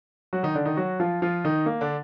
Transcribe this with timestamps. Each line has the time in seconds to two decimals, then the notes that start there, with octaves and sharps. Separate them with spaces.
0.33 F#3 F#4
0.43 D#3 D#4
0.55 D3 D4
0.66 D#3 D#4
0.77 F#3 F#4
1.00 F3 F4
1.22 F3 F4
1.44 D#3 D#4
1.66 A#3
1.81 D3 D4